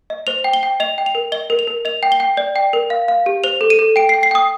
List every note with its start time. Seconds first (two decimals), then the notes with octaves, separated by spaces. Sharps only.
0.10 D#5
0.27 C5 F7
0.44 G5
0.53 G7
0.63 G5
0.80 D#5 F7
0.98 G5
1.06 F7
1.15 A#4
1.32 D#5 G7
1.50 A#4
1.59 F7
1.67 A#4
1.85 D#5 F7
2.03 G5
2.12 G7
2.20 G5
2.37 D5
2.56 G5
2.73 A#4
2.90 F5
3.08 F5
3.26 G4
3.44 C5 F7
3.61 A4
3.70 D#7
3.79 A4
3.96 G5 D7
4.09 G5 C7
4.23 C7
4.31 G5 D#6